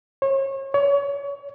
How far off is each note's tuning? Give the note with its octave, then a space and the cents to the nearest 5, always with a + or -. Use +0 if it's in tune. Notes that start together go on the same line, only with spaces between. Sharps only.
C#5 -35
C#5 +30